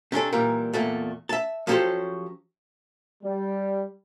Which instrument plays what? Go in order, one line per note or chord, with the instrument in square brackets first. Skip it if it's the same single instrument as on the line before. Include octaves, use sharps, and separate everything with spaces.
[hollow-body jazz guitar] C3 C#4 D4 A4
A#2 E3 G3 A#4
E2 A#2 A3
E5 A5
F3 F#3 C#4 G4 A4 C5
[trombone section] G3